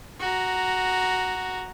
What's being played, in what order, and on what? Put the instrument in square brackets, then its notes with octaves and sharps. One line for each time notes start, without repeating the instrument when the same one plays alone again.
[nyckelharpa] F#4 A#5